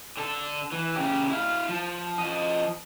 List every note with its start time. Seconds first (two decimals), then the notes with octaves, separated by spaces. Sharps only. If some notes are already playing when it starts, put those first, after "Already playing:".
0.18 D3 A4
0.72 E3
0.95 C#3 G4
1.29 E4 F5
1.69 F3
2.18 F3 D#5